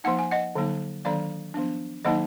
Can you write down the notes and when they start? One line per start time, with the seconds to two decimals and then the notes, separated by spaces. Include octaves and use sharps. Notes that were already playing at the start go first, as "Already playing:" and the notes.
0.04 F3 A#3 D#4 F#5
0.19 G#5
0.31 D#5 F#5
0.55 D3 F#3 A#3 D#4
1.05 D#3 F#3 A#3 D4 D5 F5
1.54 F3 B3 D4
2.05 D#3 F#3 A#3 D#4 D#5 F#5